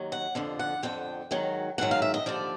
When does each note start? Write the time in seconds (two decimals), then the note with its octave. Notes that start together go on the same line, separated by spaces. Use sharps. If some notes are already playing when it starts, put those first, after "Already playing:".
Already playing: D#2 D#3 F#3
0.12 F#5
0.35 F2 D3 F3
0.59 F#5
0.83 F2 D3 F3 G5
1.31 G#2 D#3 F#3
1.78 G#2 D#3 F#3 F#5
1.91 F5
2.02 E5
2.14 D#5
2.26 D#2 D3 F3 D5